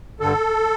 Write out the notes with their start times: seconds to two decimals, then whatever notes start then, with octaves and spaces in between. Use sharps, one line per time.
0.20 G2 D3 A4